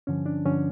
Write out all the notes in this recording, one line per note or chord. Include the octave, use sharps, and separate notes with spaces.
G2 D3 F3 C#4
D4
G2 D3 F3 C#4